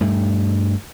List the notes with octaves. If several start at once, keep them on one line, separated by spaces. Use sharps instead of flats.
G2 A3